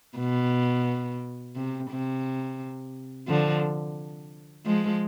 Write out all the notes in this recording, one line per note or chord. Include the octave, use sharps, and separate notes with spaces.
B2
C3
C3
D3 F3
F3 G#3